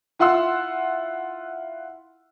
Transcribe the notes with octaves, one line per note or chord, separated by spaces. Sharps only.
E4 F4 F#5 C6 E6